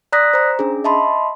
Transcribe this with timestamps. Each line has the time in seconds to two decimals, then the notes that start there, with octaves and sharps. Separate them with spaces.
0.12 D5 A#5 D#6 F#6 A#6 B6
0.34 C5 A#5
0.59 C#4 D4 G#4
0.84 D#5 E5 A5 B5 C6